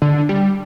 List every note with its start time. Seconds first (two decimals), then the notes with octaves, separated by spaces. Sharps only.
0.02 D3
0.29 G3